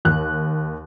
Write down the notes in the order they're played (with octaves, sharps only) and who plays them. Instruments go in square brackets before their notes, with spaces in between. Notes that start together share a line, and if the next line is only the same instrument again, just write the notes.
[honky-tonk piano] D#2 F#6